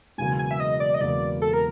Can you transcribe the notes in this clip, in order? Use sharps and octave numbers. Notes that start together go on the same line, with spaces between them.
E1 E2 C#3 F#3 A#3 G#5
G#5
E5
D#5
D5
D#5
E1 E2 C#3 F#3 A#3 D5
A4
A#4